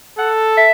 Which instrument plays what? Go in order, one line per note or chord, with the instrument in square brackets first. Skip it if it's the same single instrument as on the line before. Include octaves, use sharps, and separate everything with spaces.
[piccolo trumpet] A4 [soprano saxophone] F#5
[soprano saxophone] E5